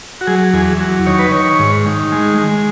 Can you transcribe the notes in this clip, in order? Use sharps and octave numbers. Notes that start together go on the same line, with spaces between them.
F#4
F#3 G#4
E2 G#4
F#3
D#3 C#5
B4
D#3 C#5
G#2
D#3
G#3
G#3